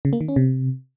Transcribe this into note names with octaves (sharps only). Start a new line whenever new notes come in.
C#3
A#3
D#3
C#4
C3